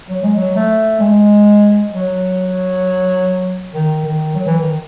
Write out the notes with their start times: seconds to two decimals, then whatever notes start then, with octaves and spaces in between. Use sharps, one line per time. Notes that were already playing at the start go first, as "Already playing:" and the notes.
0.09 F#3
0.23 G#3
0.36 F#3
0.56 A3
1.00 G#3
1.91 F#3
3.73 D#3
4.04 D#3
4.35 F#3
4.47 E3
4.60 D#3